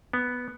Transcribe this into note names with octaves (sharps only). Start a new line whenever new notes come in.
B3